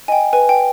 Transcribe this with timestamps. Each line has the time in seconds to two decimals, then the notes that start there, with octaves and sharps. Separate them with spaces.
0.08 D#5 G5 G#5
0.33 B4 G#5
0.49 G5